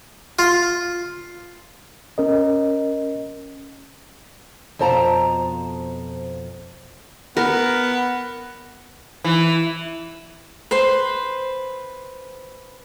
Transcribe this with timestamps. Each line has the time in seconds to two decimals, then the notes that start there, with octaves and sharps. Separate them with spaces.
0.39 F4
2.18 C#4 A#4 D#5
4.79 F2 B2 C5 A5 A#5
7.37 B3 A#4
9.24 E3
10.71 B4 C5